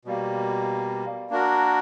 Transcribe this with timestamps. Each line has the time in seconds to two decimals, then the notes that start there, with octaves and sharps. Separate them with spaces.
0.05 B2 G3 A#3
1.30 A#3 D4 F#4 A#4